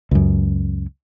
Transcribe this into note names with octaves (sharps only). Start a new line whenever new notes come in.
C#2 F#2